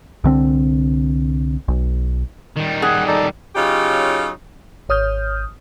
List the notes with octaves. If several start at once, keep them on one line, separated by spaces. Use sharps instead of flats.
C2 D3 C4
B1
D#3 G3
G#4 F#5
D#4 A4 D5
C#3 F#3 D#4 F4 G4
G#1 C#5 D#6 F6 G6